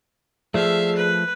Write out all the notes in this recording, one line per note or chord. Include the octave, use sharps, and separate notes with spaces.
F3 A3 G#4 D5 E5 F5
B4